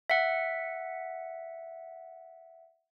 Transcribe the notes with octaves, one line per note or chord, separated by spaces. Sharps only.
E5 F#5